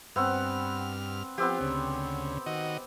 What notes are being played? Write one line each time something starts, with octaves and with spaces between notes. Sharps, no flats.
G2 B3 C4 F#5 F6
F3 B3 C4 G4
D2 C#3
D#3 F#4 D#5